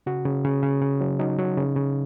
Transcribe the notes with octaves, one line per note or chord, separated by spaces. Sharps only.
C#3 F#4
C#3
C#3
C#3
C#3
F#3
F#3 D#4
F#3
C#3
C#3